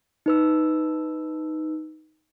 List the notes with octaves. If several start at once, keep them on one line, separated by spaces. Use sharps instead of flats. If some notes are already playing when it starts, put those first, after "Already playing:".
D#4 B4 E6